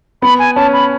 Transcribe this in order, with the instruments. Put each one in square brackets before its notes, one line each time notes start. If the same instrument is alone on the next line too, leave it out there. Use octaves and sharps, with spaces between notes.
[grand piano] B3 [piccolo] B5
[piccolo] G#5
[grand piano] C#4 [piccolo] A5
[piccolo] B5